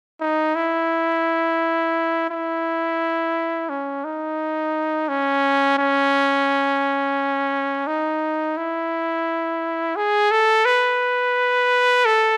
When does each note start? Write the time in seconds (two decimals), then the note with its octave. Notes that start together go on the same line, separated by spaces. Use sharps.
0.21 D#4
0.55 E4
2.30 E4
3.70 C#4
4.05 D#4
5.09 C#4
5.78 C#4
7.87 D#4
8.58 E4
9.96 G#4
10.31 A4
10.65 B4
12.05 A4